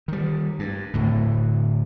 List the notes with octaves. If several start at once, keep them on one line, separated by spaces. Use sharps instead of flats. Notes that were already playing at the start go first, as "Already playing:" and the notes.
D#3 G3
G2
D1 A2 D3